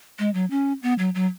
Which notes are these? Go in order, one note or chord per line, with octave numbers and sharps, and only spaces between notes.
G#3
F#3
C#4
B3
F#3
F#3